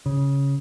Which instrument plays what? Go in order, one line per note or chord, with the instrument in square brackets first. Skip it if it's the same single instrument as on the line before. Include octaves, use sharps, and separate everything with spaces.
[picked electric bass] C#3